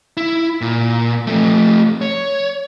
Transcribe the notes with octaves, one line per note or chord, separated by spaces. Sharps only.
E4
A#2
F3 A3
C#5